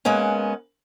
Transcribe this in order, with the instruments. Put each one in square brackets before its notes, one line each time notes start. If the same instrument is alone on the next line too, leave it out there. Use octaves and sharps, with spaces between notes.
[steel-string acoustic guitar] G#3 A#3 B3 C#4